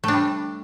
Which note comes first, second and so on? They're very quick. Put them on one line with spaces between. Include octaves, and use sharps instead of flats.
A3 D4 G3